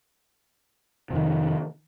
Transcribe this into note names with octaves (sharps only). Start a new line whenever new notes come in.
F2 C3 D#3